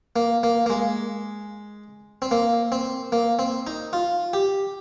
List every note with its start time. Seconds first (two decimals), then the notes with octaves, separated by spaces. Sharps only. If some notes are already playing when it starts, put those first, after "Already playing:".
0.16 A#3
0.43 A#3
0.66 A#3
0.70 G#3
2.22 C4
2.31 A#3
2.72 C4
3.12 A#3
3.39 C4
3.67 D#4
3.93 F4
4.33 G4